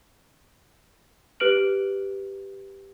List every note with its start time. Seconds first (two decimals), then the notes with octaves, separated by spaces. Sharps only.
1.40 G4 B4 F6 D7 F#7